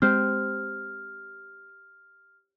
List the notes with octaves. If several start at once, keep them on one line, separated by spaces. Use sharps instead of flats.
G#3 C4 G4 C5 F6